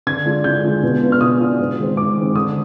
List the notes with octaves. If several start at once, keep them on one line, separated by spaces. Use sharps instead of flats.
D3 G#6
G#3 D4 F4
D3 G6
G#3 D4 F4
B2
B3 D4 F4
F6
B2 D#6
B3 D4 F4
G#2
D#3 G#3 C4
G#2 D6
D#3 G#3 C4
D3 D#6